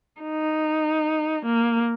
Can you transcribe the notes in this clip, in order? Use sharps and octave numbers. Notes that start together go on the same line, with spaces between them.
D#4
A#3